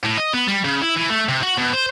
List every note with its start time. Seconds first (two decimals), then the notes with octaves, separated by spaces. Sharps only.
0.04 A2
0.17 D#5
0.33 B3
0.48 G3
0.65 C#3
0.82 E4
0.97 E3
1.10 A3
1.29 C3
1.43 F#4
1.58 B2
1.73 C5